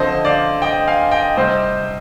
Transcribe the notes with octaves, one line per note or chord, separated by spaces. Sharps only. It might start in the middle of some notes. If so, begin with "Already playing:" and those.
Already playing: D3 F3 C4 C5 D#5
D5 F5
D#5 G5
F5 G#5
D#5 G5
C3 G3 C4 C5 D#5